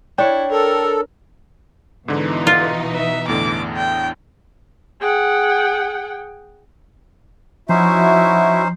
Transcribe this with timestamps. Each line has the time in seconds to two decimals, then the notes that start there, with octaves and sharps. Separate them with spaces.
0.18 D4 E4 C#5 G5
0.51 A4 A#4
2.08 G#2 B2 D3 E3 D#4
2.47 F4
2.95 B4 E5
3.28 E2 A2 D3 D6
3.77 G5
5.00 G#4 F#5 G5
7.69 F3 C#4 D#4 E4 F#4 C5 E5